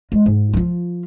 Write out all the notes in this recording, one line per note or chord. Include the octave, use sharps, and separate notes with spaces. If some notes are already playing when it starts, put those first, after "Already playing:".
G#3
G#2
F3 F4